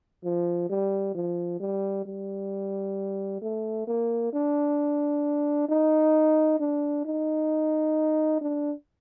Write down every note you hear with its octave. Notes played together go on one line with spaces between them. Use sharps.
F3
G3
F3
G3
G3
A3
A#3
D4
D#4
D4
D#4
D4